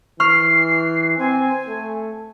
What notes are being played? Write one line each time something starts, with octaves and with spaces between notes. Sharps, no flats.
E3 C#6 F6 C7
C4 G#5
A3